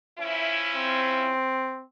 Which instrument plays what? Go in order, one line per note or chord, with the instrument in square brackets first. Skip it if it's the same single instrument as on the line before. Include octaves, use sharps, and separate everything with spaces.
[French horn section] F3 C#4 E4
[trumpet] C4